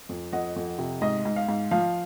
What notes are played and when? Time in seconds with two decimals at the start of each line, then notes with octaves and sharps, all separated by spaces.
0.09 F2
0.32 F2 D#5 F#5
0.56 F2
0.79 C3
1.02 G#2 D#5
1.25 G#2
1.36 F5
1.48 G#2
1.71 F3 F5